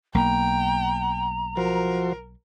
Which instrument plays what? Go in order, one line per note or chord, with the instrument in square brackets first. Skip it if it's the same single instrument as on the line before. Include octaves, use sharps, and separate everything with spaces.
[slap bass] B1 A#3 [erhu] G5 [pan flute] A#5
[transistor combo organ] F3 F#4 C5 [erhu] A#4